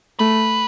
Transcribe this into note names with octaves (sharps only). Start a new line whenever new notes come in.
A3 B4